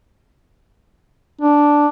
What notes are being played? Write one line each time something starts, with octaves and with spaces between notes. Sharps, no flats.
D4